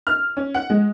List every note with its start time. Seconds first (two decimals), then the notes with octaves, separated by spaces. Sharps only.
0.07 F6
0.37 C#4
0.54 F#5
0.70 G#3